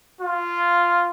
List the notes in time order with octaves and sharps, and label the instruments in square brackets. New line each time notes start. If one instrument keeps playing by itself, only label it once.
[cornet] F4